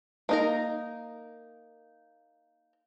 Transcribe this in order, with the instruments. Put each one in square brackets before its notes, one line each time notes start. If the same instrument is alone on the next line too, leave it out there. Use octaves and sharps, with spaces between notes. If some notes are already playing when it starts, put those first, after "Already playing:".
[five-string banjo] A#3 D#4 A#4